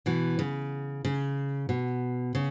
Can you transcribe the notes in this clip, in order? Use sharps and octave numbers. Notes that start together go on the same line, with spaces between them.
B2 E3
C#3
C#3
B2
C#3